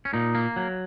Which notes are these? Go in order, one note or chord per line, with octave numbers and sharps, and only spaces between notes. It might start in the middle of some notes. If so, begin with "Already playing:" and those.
C#4
A#2 D#4
A#3
F#3